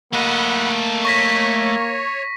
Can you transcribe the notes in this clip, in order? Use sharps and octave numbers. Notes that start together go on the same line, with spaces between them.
A3 A#3 D#5 F#5 B5
C#5 C#6 A#6 B6